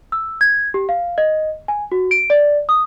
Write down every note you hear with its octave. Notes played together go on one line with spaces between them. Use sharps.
E6
G#6
G4
F5
D#5
G#5
F#4
D7
D5
D#6